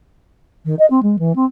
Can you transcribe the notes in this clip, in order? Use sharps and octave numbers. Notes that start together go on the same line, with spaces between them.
D#3
D#5
C4
G#3
E3
C4